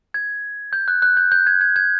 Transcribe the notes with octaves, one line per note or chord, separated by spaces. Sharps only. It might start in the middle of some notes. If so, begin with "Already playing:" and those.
G#6
G6
F#6
F#6
G6
G6
G#6
G#6
G#6